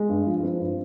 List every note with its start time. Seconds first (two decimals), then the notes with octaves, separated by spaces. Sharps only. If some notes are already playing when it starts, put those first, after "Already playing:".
Already playing: G#3
0.09 G2
0.27 F3
0.43 C4
0.59 G2